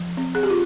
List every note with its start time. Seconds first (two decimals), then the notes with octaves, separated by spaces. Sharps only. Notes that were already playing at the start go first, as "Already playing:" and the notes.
Already playing: F3
0.17 C4
0.35 G#4
0.43 G4
0.50 F4